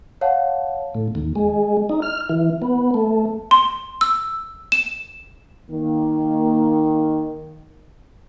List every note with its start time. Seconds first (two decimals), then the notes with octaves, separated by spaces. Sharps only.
0.21 C#5 F5 F#5 A5
0.95 A2
1.15 D#2
1.36 G#3
1.89 D#4
2.02 F6
2.29 E3
2.62 B3
2.94 A3
3.51 C6
4.01 E6
4.72 E7
5.70 D#3 A#3